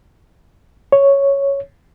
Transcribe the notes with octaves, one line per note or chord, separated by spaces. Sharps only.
C#5